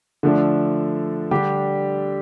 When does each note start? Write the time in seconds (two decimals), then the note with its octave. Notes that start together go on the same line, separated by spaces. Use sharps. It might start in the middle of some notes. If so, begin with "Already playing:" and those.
0.23 D3 F3 A3 D4
1.31 D3 G3 D4 G4